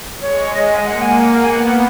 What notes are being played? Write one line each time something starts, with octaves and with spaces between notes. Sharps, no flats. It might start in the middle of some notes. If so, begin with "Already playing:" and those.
G#3 C#5
G#3 D#5
G#5
A#3 F#5
G#5
F#5
F5
G#5
B3 F#5
F#5